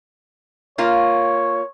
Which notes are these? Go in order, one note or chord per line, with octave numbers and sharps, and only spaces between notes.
A#3 F4 C#5